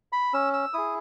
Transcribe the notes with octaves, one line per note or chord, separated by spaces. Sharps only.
B5
C#4 E6
E6
E4 G#4 D#6